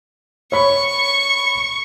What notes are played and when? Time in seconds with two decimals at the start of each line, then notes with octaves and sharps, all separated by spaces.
0.52 C#5 B5 C#6